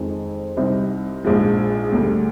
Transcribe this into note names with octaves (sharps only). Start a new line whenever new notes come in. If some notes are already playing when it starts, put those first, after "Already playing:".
Already playing: F2 D#3 G#3 C4
C2 C3 G3 C4 D#4
A#1 G#2 F3 G#3
D2 D3 G3